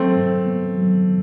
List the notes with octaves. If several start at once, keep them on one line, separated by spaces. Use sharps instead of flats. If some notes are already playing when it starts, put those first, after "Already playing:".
Already playing: F#3 A3 C4
G2
B3
F#3